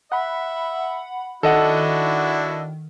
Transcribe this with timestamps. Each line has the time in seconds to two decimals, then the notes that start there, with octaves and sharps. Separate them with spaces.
0.12 E5 F#5 B5
1.43 D#3 D4 E4 F#4 A4 D#5 F#5